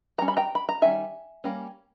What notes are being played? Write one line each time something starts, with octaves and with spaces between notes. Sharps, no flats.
D#3 G3 C#4 A#5
B5
G5 A#5
B5
A#5
D#3 G3 C#4 E5 G#5
G3 A#3 C#4